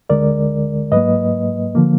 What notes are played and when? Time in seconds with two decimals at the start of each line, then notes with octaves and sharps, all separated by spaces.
0.09 D2 D3 G#3 A#4 D5
0.92 G#2 F#3 A#3 B4 D#5
1.75 D3 F3 A#3